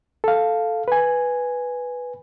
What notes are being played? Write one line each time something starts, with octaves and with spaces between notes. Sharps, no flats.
A4 F5
B4 G#5